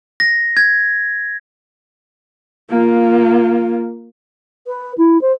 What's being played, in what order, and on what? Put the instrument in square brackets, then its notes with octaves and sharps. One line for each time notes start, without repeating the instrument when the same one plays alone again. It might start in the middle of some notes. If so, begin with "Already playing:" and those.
[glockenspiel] A#6
G#6
[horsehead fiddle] A#3 F4
[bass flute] B4
E4
C5